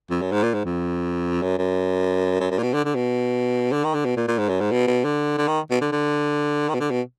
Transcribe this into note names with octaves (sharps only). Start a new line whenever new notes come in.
F2
F#2
G#2
A#2
G#2
F2
F#2
F#2
F#2
F#2
A#2
B2
D3
D3
B2
D3
D#3
D3
B2
A#2
A#2
G#2
F#2
G#2
B2
B2
D3
D3
D#3
B2
D3
D3
D#3
B2
D3
B2